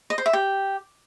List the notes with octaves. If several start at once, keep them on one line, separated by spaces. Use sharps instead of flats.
D#5
C5
E5
G4